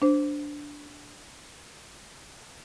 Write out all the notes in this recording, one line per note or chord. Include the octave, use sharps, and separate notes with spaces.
D4 C5